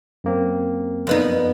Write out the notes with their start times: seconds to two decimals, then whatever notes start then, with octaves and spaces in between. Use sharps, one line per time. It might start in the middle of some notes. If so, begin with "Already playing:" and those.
0.24 F#2 A#3 C4
1.07 F2 B3 D#4